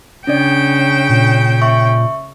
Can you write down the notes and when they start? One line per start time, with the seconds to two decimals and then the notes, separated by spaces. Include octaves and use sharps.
0.27 C#3 C#4 D4 D5 G5
1.10 A#2
1.62 E5 C#6